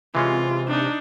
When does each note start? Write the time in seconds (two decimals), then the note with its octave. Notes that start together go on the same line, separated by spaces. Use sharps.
0.15 C3 E3 G#3 C#4 F4
0.68 D4 D#4